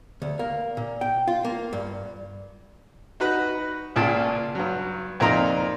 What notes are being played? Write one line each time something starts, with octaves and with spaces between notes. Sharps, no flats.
D2
A#3
A#2
G5
F4
A#3
G2
D#4 F#4 B4 B5
C#2 A#2 G#4 A5
G2 F#3
F2 A#2 A#3 D#4 A#5 C6